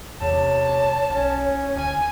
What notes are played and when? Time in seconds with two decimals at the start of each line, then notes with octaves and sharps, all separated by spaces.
0.22 E2 C3 C#5 A5
1.10 B1 C#4
1.76 D2 G#5